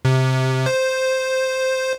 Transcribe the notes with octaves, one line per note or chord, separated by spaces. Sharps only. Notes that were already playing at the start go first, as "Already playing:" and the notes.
C3
C5